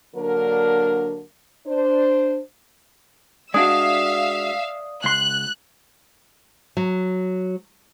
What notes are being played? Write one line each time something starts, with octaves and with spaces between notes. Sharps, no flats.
D3 F#3 A#3 D4 A#4
D4 C5
G#3 D4 F#4 D5 E5 F5 D#6 E6
C#2 C6 F#6
F#3